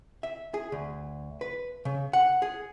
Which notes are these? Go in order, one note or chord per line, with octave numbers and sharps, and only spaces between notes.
E5
G#4
D2
B4
C#3
F#5
G#4